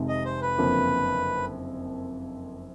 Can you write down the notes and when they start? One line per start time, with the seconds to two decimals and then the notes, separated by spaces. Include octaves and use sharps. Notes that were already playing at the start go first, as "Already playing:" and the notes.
Already playing: F1 F2 C3 D#3 G#3
0.08 D#5
0.25 C5
0.41 B4
0.58 F#1 F2 D3 F3 A#3